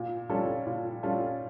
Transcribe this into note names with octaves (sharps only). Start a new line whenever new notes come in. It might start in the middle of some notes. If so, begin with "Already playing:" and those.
Already playing: A#2
G3 C#4 F4 A4
A#2
G3 C#4 F4 A4